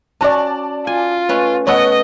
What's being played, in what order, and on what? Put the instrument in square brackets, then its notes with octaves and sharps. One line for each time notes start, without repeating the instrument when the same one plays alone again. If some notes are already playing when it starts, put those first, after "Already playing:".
[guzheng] C#4 F#4 [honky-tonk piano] D5 A5
[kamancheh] F4 [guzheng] G#5
[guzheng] A3 C#4 B4
[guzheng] A3 B3 A4 [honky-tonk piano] C#5 F#5 [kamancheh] D#5